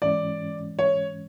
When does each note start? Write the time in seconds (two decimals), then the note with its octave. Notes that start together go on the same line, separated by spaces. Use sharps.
0.02 G#2 E3 G#3 C#4 D5
0.79 C#5